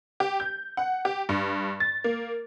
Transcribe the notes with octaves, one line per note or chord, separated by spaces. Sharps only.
G4
G6
F#5
G4
G2
A6
A#3